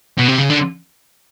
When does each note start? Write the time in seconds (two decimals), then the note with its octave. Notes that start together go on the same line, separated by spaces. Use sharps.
0.18 B2
0.28 C3
0.38 C#3
0.50 D3